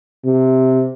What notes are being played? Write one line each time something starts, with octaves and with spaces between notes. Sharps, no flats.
C3